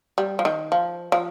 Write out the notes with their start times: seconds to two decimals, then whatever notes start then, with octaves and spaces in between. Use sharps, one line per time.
0.18 G3
0.39 F3
0.45 D#3
0.72 F3
1.12 F3